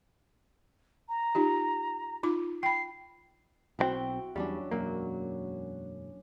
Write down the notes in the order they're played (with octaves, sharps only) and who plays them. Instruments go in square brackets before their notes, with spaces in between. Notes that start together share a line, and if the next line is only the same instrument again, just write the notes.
[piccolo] A#5
[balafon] D#4 F4 G4
D#4 F4 D6
[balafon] G5 B5 [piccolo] C7
[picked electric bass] B1 D#3 C4 [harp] E4 F#4 G5
[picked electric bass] E2 G3 [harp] F#3 C#4 D4
[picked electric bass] E1 F#2 A#3 [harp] F#3